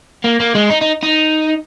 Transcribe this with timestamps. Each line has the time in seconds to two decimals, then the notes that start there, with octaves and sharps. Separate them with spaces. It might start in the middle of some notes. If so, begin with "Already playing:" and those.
0.24 A#3
0.40 A#3
0.55 G#3
0.70 D#4
0.82 D#4
1.03 D#4